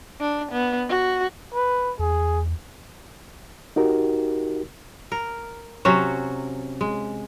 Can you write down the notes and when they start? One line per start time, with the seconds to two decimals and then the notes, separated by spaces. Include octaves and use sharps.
0.21 D4
0.52 B3
0.89 F#4
1.54 B4
1.99 E2 G#4
3.76 D#4 F#4 G4 A#4
5.12 A#4
5.85 C3 F#3 C#4 F#4
6.81 G#3